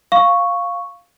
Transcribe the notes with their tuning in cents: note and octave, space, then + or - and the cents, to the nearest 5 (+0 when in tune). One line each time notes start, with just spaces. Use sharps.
F5 +0 C#6 +0